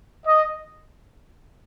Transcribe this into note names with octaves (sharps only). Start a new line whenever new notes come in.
D#5